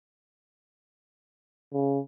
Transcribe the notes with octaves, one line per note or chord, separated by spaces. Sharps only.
C#3